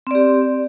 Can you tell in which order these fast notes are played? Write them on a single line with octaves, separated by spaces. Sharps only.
C4 D5 G4